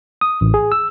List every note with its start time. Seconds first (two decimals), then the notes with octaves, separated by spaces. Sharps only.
0.21 D#6
0.41 A1
0.54 G#4
0.72 E6